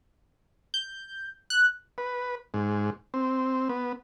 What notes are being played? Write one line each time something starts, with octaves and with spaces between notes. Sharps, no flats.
G6
F#6
B4
G#2
C4
B3